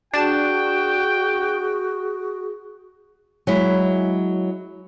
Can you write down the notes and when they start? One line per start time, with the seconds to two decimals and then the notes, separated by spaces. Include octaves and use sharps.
0.14 D4 F#4 G#4 G5 E7
3.47 F#3 G#3 E4